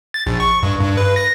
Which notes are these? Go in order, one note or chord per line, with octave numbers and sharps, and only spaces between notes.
A6
A#1
C#6
G2
G2
B4
A#6